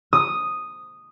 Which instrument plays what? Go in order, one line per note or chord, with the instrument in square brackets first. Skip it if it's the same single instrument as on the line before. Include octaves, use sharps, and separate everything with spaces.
[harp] D#6